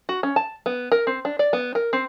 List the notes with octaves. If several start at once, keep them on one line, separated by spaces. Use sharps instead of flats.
F#4
C#4
A5
B3
A#4
C4
D4
D5
B3
A#4
C4